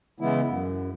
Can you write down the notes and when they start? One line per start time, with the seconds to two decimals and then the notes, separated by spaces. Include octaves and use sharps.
0.20 C#3 E3 G#3 B3 E4
0.46 F#2